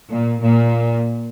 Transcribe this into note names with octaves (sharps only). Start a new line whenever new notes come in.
A#2
A#2